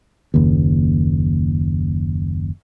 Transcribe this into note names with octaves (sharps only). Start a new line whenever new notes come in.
F#1 D#2